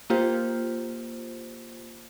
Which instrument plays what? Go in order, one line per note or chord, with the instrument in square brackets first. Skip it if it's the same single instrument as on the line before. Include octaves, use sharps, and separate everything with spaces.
[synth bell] A#3 F4 G4 C5